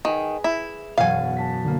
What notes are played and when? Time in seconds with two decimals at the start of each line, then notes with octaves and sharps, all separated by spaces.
0.05 D#3 G#4 B4 G#5
0.44 E4
0.98 E1 F#2 B2 F5 G#5
1.37 A5 B6
1.64 D3 A#3